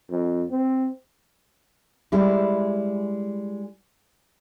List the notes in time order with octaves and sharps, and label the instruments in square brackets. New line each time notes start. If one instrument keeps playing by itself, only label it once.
[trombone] F2
C4
[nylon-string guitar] G3 G#3 E4